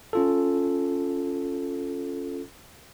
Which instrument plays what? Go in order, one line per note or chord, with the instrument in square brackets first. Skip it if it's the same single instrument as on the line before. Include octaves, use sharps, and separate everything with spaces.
[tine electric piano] C#4 F4 A4